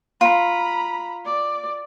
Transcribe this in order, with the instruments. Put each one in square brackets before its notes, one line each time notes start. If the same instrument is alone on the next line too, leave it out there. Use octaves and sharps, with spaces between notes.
[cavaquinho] F4 [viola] A#5 B5
[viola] D5